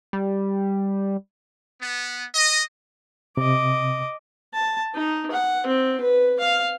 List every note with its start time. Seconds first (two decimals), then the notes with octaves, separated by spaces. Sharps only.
0.13 G3
1.82 B3
2.35 D#5
3.37 C3 D#5 D6
4.54 A5
4.94 D#4
5.31 F#5
5.66 C4
6.01 B4
6.40 F5